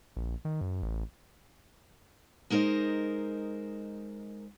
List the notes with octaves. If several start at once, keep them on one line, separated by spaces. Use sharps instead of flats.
A#1
D#3
F#2
A1
G#3 D#4 A#4 C5 D#5